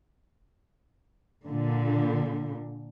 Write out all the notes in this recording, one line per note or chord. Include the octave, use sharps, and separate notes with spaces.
A#2 D3